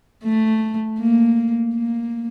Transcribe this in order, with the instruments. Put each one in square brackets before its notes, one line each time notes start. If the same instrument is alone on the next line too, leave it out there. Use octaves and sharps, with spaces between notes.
[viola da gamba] A3
A#3
A#3